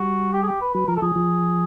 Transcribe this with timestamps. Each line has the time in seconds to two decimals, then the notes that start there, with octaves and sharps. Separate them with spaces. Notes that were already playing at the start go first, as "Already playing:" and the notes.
Already playing: G3 F#4
0.33 G4
0.43 G#4
0.47 G4
0.61 B4
0.74 F#3 B4
0.88 F3 A#4
0.96 A4
1.02 F3 G#4
1.16 F3